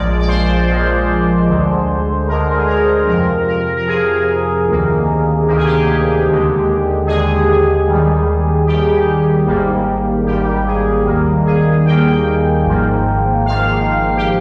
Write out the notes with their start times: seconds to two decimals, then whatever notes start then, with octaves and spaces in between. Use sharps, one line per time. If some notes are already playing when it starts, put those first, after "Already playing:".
Already playing: A#1 A#2 F3 G#3 D5
0.20 D5
0.28 C5
0.68 A#1 A#2 F3 G#3
1.48 D2 D3 G#3
2.28 D2 D3 G#3 A#4
2.56 G#4
2.68 A#4
3.07 F2 C3 F3 A#4
3.47 A#4
3.77 A#4
3.87 F2 C3 F3 G#4
4.67 D2 C3 D#3 A#3
5.47 D2 C3 D#3 A#3 G4
5.57 G#4
5.66 G4
6.27 D#2 D3 G#3
7.07 D#2 D3 G#3 G#4
7.87 D#2 D#3 G3
8.66 D#2 D#3 G3 G4
9.46 G#1 G#2 G3 A#3
10.26 G#1 G#2 G3 A#3 G4
10.66 G#4
11.06 D#2 D#3 G3 A#3
11.45 G#4
11.86 D#2 D#3 G3 A#3 G5
12.66 G#1 G#2 F3 A#3
13.45 G#1 G#2 F3 A#3 F5
14.16 G4